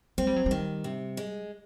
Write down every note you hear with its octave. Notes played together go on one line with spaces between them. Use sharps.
G#3 C4
G3
F#3
D#3 G3
C3
G#3